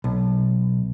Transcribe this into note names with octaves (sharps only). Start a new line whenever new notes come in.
B1